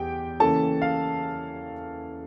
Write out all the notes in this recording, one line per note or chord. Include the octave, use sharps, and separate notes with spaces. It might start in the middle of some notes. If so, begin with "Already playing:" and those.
Already playing: E2 G4 G5
C#3 E3 A#3 C#4 A4 A5
F5